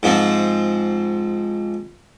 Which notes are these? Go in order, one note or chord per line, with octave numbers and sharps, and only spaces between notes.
G#2 F3 C4